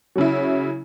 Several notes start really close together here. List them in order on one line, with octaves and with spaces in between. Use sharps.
F#3 C#3 E4